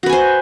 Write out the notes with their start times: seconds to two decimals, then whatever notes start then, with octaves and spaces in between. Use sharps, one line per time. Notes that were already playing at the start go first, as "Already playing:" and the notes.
0.03 F#4
0.06 B4
0.09 G#5
0.13 C5